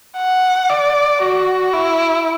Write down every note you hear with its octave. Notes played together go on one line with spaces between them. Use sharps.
F#5
D5
F#4
E4